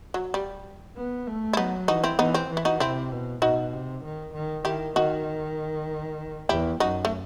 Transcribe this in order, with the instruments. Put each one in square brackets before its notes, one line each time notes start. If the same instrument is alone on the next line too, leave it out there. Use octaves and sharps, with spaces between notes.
[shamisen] F#3
G3
[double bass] B3
A3
[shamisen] E4
[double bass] F#3 [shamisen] B3 D#4
[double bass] E3 [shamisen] D#4 F#4
[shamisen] C4 E4
[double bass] E3 [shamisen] B3 D#4
[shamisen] C4
[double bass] E3
[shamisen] E4
D#4 F#4
[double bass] C3 [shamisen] C4 E4
[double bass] B2
[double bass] B2 [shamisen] D#4 F#4
[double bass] C3
D#3
D#3
[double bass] D#3 [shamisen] E4 G4
[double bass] D#3 [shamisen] D#4 F#4
[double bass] E2 [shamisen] E4 G4
[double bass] F#2 [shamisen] D#4 F#4
[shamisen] A3